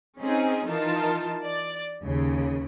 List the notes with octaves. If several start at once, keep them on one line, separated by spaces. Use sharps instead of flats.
C4 C#4 D#4 G#4
E3 D#4 F4 A#4 A5
D5
D#2 C#3